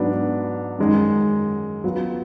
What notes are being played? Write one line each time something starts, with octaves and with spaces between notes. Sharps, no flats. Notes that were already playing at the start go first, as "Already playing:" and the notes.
Already playing: G#2 F#3 B3 D4
F#2 D#3 G#3
F#3 B3 F4 B4